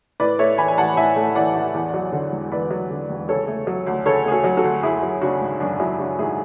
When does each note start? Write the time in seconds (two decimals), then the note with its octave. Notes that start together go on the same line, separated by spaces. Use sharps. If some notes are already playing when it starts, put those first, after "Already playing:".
0.20 A2 B4 D5
0.39 A3 C#5 E5
0.58 E3 G#5 B5
0.68 G#5
0.78 A1 F#5 A5
0.97 A2 E5 G#5
1.16 A3
1.35 E3 D5 F#5
1.55 A1
1.74 E2
1.94 F#3
2.12 D3
2.32 E1
2.51 E2 B4 D5
2.71 F#3
2.90 D3
3.10 E1
3.29 C#3 A4 C#5
3.48 A3
3.67 F#3
3.87 D2
4.05 C#3 A4 C#5
4.25 A3 G#4
4.31 F#4 A4
4.44 F#3
4.57 F#4 A4
4.64 D2
4.83 F#2 E4 G#4
5.03 F#3
5.21 C#3 D4 F#4
5.41 G#1
5.60 F#2 D4
5.80 F#3 E4
5.98 C#3 D4 F#4
6.18 G#1 E4 G#4